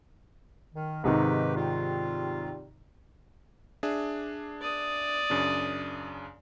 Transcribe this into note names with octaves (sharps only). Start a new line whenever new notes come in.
D#3
G#2 C3 D#3 D#4 G4 B4
G3 C4 F4
D4 G#4 E5
D5 D#6
F#2 C#3 D4